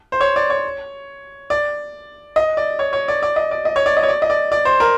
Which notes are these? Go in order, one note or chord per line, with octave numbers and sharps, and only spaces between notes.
C5
C#5
D5
C#5
D5
D#5
D5
C#5
C#5
D5
D5
D#5
D5
D#5
C#5
D5
D#5
C#5
D5
D#5
D5
D5
C5
A#4